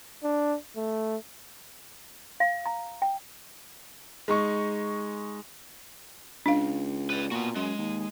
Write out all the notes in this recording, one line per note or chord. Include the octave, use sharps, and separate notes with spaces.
D4
A3
F5
A#5
G5
G#3 D#4 C#6
C#2 D4 F5
B4 D5
A#2 B3 F#4
F#2 G#3
D#2